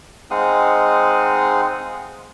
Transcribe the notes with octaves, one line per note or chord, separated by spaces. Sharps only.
G#3 C4 D#4 F5 F#5 D#6